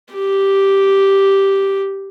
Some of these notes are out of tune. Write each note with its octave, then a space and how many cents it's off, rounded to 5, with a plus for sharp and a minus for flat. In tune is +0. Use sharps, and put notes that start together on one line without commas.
G4 -5